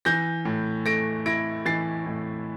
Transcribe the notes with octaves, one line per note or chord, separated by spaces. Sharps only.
E3 G6 A#6
A2
A3 A#6 D7
E4 A#6 D7
E3 A6 C7
A2